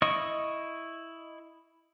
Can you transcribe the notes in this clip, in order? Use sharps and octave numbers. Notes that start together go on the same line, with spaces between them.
E4 D#5 C#6